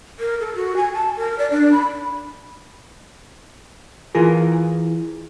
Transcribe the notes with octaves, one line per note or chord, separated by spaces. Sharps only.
A#4
A4
F#4
G#5
A5
A#4
D5
D4
B5
E3 F4 G#4 A#4